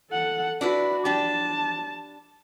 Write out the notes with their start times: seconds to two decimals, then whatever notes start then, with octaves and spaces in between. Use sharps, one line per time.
0.10 A4 F#5
0.61 D4 E4 F#4 B4
1.05 D4 G4 A5